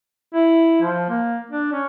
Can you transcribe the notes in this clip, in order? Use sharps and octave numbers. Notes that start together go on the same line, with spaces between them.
E4
F3
A#3
D4
C#4